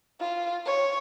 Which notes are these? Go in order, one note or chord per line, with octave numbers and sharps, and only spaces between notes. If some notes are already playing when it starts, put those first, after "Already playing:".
F4
C#5